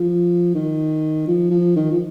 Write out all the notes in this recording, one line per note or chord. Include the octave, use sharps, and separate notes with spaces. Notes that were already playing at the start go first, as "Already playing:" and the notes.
Already playing: F3
D#3
F3
F3
D#3
F3